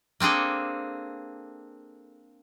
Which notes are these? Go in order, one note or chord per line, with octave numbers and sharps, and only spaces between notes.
A#3 C4 D4 G#4 A4